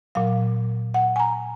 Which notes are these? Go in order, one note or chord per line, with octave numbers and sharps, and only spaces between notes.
A#2 F#3 F5
F#5
G#5
A#5